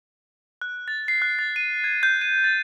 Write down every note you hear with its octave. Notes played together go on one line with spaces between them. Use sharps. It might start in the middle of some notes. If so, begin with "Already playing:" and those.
F#6
A6
C7
F#6
A6
D#7
G#6
G6
D#7
A6